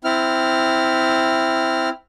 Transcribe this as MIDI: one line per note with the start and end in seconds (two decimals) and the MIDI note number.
0.04 1.89 60
0.04 1.89 64
0.04 1.89 89